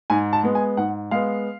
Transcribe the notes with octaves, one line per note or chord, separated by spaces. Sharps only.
G#2 G#5
A5
G#3 B3
G#5
G#2 F#5
G#3 B3 F5